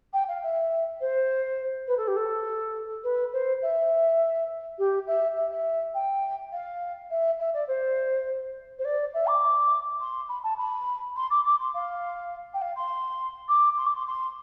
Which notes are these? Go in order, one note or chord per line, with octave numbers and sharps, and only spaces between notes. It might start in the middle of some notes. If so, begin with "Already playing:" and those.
G5
F5
E5
C5
B4
A4
G4
A4
B4
C5
E5
G4
E5
E5
E5
G5
F5
E5
E5
D5
C5
C5
D5
E5
D6
C6
B5
A5
B5
C6
D6
D6
C6
F5
G5
F5
C6
D6
C6
D6
C6
C6